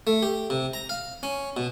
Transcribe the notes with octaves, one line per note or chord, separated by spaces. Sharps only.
A3
G4
C3
A#5
F5
C#4
B2